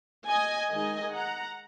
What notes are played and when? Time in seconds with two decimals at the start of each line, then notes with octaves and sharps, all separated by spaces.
0.27 D#5 G#5
0.70 D#3 G#3 D#4 D#5 G#5
1.13 F#5 A#5